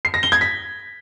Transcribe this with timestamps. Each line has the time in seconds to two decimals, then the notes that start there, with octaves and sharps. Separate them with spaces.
0.05 C7
0.14 A#6
0.23 G7
0.32 G#6
0.41 B6